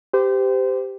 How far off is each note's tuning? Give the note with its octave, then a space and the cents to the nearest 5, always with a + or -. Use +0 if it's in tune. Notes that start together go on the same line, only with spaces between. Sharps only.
G4 +0 C5 -30